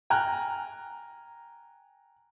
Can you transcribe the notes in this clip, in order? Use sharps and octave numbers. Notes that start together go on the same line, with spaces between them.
G5 G#5 A#5 F6 F#6